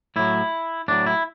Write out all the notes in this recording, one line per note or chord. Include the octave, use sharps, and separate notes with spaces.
A2 F#3 E4
A2 F#3 D4
E4